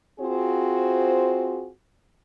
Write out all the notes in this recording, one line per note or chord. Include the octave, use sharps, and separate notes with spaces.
C4 F4 F#4 G#4 C5